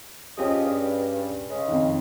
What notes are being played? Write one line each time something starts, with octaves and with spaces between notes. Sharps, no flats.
F3 C#4 G4 G#4 D#5
G2
C#3 G#3
F2 D#3